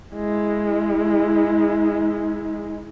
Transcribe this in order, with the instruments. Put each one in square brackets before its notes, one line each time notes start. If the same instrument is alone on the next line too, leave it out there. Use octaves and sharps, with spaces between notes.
[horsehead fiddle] G#3 E4